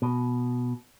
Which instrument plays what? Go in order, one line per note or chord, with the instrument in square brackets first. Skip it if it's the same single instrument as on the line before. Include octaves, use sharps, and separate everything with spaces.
[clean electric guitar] B2